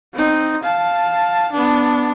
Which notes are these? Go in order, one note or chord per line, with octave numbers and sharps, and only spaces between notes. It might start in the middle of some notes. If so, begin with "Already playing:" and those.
C4 D#4
F5 A5
B3 D4